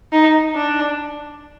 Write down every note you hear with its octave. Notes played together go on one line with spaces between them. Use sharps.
D#4
D4